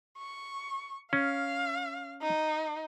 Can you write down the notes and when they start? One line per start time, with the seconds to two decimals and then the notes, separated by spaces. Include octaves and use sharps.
0.18 C#6
1.13 C#4 F5
2.22 D#4